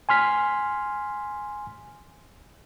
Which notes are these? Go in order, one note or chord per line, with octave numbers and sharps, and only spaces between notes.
G#5 C6 F6 B6